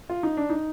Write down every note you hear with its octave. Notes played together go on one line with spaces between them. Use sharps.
F4
D#4
D4
D#4